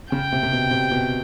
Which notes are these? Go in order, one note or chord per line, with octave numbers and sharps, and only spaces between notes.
C#3 G5
C3
C3
B2
C3
B2